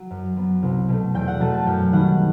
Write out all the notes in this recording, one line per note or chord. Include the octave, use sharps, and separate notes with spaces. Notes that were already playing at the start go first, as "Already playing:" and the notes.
Already playing: F#3
F#2
F#3 B3
C2
B2 A3
E2 G5
F#5
B2 F#3 A3 A5
A5
F#2 G5
D#3 G3 B3 F#5